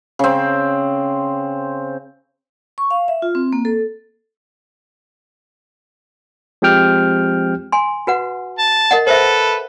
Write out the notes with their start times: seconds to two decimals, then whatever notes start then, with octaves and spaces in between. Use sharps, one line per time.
0.19 C#3 C4
2.78 C#6
2.91 F5
3.08 E5
3.22 F4
3.35 C4
3.53 A#3
3.65 A4
6.62 F3 G#3 C4 G4 G5 F6
7.72 G#5 C6
8.07 F#4 B4 F#5
8.58 A5
8.91 A#4 D#5 F#5
9.07 A4 B4 C5 E5